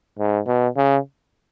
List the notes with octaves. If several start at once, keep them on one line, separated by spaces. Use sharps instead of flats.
G#2
B2
C#3